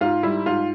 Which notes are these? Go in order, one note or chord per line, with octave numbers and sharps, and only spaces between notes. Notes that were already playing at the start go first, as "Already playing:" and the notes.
G#2 F4
G3 E4
G#2 F4